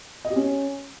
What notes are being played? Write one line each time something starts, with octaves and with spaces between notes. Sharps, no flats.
D#5
G4
C#4